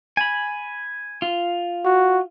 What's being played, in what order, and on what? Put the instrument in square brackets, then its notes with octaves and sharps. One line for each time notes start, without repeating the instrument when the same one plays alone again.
[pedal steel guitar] G#5 B5
F4
[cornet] F#4